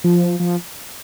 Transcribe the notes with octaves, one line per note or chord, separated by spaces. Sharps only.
F3
F3